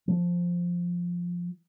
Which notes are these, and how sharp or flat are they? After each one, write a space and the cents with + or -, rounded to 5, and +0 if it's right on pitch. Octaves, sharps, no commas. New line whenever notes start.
F3 +5